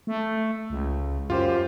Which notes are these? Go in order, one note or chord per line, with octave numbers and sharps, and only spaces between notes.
A3
C#2
F#2 F4 G4 C5